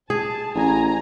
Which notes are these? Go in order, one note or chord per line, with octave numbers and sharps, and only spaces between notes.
G#4 A5
A1 G#5 A#5